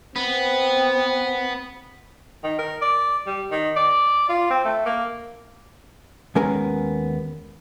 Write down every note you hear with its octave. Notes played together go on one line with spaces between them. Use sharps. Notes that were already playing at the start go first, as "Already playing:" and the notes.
B3 C4
D#3
A#4
D5
G3
D#3
D5
F4
C4
A3
A#3
D#2 G#3 B3 C#4 A#4 G#5